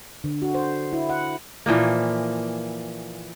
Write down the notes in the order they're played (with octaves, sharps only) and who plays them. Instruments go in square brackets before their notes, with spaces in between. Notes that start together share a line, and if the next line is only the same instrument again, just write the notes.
[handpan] D3
F#4
C5
E4
F#5
[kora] A#2 E3 F3 A#3